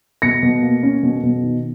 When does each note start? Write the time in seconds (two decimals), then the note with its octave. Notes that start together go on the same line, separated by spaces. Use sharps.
0.22 B2 A#6 C#7
0.43 B2
0.62 A#3
0.83 C#4
1.03 B2
1.23 B2
1.43 D#3